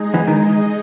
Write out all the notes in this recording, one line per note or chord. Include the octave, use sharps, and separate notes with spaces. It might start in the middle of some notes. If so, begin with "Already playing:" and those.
Already playing: G#3 D#4 G#4 D#5
E2 E3
D#3